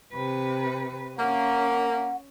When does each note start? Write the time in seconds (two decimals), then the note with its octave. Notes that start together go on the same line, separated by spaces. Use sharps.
0.14 C3 B4
1.18 A#3 C#4 F#5